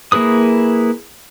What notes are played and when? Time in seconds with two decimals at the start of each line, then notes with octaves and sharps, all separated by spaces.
0.12 A#3 E4 G#4 B4 D#6